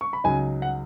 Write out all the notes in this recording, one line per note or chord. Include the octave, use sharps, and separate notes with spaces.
C#6
B5
C#2 C#3 F#3 D#4 G#5
F#5